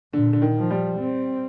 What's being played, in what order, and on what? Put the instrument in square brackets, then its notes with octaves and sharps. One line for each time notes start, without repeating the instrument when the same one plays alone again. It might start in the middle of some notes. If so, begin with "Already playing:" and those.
[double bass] A#2 [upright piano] D3
[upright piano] D3
D#3
[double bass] F3
[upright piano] G3
[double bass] C4